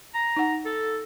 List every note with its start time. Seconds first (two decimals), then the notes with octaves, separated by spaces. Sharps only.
0.14 A#5
0.37 D#4 F#5
0.65 A4